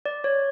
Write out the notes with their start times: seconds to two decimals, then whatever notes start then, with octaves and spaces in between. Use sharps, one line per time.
0.06 D5
0.24 C#5